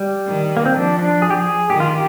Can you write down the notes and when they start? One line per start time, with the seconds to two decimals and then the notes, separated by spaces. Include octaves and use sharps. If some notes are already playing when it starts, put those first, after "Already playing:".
Already playing: G3
0.28 D#3
0.57 A#3
0.66 C4
0.74 F3 D4
0.99 D4
1.22 G#4
1.30 G4
1.37 G#4
1.70 D#3 G4
1.80 F4
1.91 G4